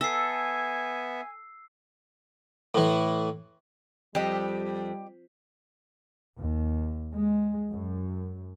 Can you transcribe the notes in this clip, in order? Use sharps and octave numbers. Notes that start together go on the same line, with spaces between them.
B3 A4 E5 G#5 E6 C7
A2 E3
F2 G3 G4 D#5
D#2
G#3
F#2